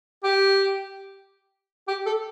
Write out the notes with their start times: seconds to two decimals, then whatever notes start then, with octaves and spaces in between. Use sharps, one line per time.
0.24 G4
1.88 G4
2.06 A4